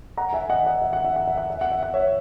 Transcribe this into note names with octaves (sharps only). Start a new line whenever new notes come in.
F#5 A#5
E5 G#5
D#5 F#5
D#5 F#5
E5
F#5
E5
F#5
E5
F#5
E5
F#5
E5
F#5
C#5 E5